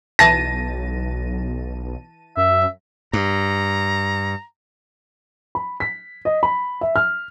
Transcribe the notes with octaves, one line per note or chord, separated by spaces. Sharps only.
B1 E3 A5 A#6 D#7
F#2 E5
G2 A#5
B5
B6
D#5
B5
E5
F6